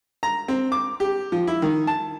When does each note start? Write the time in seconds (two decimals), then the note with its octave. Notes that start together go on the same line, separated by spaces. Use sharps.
0.23 A#5
0.48 C4
0.72 D6
1.00 G4
1.32 F3
1.47 E4
1.62 D#3
1.87 A5